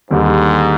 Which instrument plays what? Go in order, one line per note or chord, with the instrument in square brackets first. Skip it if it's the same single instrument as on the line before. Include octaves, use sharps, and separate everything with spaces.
[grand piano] D#2 D3 G3 [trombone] G#2